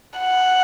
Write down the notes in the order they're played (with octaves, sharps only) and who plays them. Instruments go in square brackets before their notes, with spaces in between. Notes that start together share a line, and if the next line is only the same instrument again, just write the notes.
[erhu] F#5